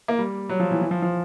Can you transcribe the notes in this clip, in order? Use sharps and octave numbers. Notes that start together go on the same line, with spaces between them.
A#3
G3
F#3
F3
E3
E3
F3
F3